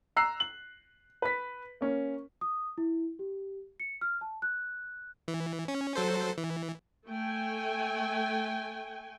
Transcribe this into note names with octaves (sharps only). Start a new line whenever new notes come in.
A#5 E6 F#6 C7
F#7
B4 B6
A#3 C#4
D#6
E4
G4
C#7
F6
A5
F#6
E3
C#4
F#3 A4 C5
E3
A3 G5 G#5